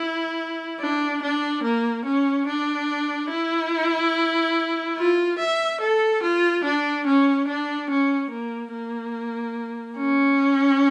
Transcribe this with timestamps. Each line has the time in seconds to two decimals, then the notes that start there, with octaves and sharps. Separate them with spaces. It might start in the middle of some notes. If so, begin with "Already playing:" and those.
Already playing: E4
0.80 D4
1.22 D4
1.63 A#3
2.05 C#4
2.47 D4
3.30 E4
4.97 F4
5.38 E5
5.80 A4
6.22 F4
6.64 D4
7.06 C#4
7.47 D4
7.89 C#4
8.30 A#3
8.73 A#3
9.97 C#4